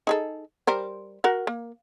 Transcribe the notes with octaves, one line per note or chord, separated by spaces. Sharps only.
D#4 G#4 A4
G3 A#4 C5
F#4 A#4 F#5
A#3